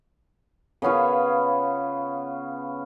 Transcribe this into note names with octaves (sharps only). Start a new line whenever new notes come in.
C#3 B3 C#4 F4